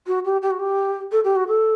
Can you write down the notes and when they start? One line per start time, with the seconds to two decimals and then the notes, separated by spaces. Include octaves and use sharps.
0.07 F#4
0.25 G4
0.42 G4
0.51 F#4
0.59 G4
1.12 A4
1.24 G4
1.36 F#4
1.48 A4